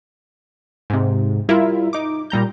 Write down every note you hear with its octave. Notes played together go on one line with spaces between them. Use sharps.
G#2 C3
G3 E4 F4 A#4 E5
D#4 D6
A#2 G3 A#5 G6